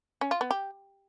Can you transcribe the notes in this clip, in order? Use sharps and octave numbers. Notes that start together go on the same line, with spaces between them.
C#4
F4
B3
G4